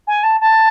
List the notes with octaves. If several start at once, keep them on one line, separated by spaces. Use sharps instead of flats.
G#5
A5
A5